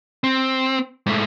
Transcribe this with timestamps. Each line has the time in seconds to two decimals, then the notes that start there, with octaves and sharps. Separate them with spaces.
0.24 C4
1.06 G#2 A3